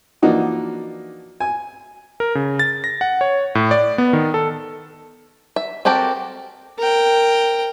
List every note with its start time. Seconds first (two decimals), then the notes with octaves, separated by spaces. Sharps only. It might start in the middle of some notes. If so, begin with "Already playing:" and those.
0.22 E3 F3 A#3 D4 D#4 F#4
1.40 G#5
2.20 A#4
2.35 C#3
2.59 A6
2.84 A#6
3.01 F#5
3.21 C#5
3.55 A2
3.71 D5
3.98 B3
4.13 D#3
4.34 A4
5.56 E5
5.85 C4 F#4 G4 A4 A#4
6.79 A#4 G5